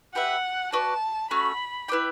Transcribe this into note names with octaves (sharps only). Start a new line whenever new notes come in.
G4 B4 E5 F#5
F#4 B4 D5 A5
A3 C#4 F#4 B5
E4 B4 D5 G5